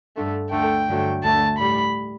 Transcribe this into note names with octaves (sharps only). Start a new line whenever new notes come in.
G2 D3 A3
D2 D3 A3 G5
G2 D3 F#3 A3
D2 D3 A3 A5
A2 G3 B5